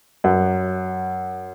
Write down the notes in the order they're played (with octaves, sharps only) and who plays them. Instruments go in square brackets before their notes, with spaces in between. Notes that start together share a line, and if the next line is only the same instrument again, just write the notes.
[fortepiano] F#2